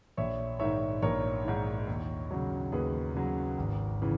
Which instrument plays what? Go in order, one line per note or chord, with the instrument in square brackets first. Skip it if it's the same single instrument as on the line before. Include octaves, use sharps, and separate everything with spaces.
[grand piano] A#1 C#5 E5
G#2 D#3 C#5 E5
A#1 A#4 C#5
G#2 D#3
D#2
C#3 F#3
D#2 G#4 B4
C#3 F#3
G#1
C#3 E3